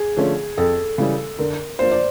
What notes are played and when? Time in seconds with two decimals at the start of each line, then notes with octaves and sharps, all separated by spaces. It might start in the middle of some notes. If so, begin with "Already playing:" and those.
Already playing: G#4
0.17 D3 F3 A3 C#4
0.57 F2 A4
0.98 C#3 E3 G3
1.39 D3 A#4
1.79 F3 A#3 D4 C5
1.91 D5